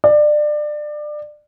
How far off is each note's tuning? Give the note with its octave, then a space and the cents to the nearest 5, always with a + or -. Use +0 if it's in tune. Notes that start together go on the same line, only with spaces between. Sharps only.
D5 +25